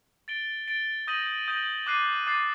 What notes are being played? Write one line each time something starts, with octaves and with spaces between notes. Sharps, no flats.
A6 D7 G7
A6 D7 G7
D#6 G6 A#6 D#7 F#7
D#6 G6 A#6 D#7 F#7
D6 F#6 A6 C7 D#7
D6 F#6 A6 C7 D#7